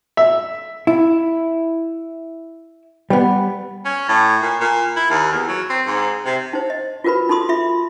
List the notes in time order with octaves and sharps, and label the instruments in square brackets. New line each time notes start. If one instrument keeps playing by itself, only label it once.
[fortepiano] E5
[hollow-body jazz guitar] E4
G3 B3
[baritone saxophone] C#4
A2
A#2
A#2
E4
D#2
E2
F#3
C4
G#2
C3
[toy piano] D#4 C5
D#5
F4 F#4 A#4 B4 B5
D#4 A4 B5 C6 D#6
F4 E5 B5